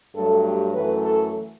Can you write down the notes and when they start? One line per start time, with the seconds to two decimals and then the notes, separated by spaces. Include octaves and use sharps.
0.15 G2 F#3 A3 A4
0.44 G4
0.74 F#2 E3 A3 B4
1.03 A4